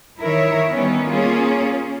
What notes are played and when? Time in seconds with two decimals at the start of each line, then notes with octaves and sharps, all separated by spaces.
0.20 D#3 E4 A#4 C#5 E5
0.71 D#3 G3 B3 C#4
1.09 A#3 C#4 F4 G#4